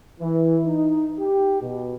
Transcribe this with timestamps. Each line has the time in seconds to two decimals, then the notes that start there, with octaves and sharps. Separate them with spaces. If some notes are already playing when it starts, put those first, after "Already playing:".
0.20 E3
0.66 D#4
1.19 G4
1.61 B2